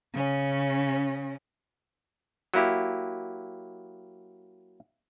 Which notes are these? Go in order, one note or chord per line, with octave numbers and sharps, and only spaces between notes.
C#3 C#4
F#3 A#3 E4 G4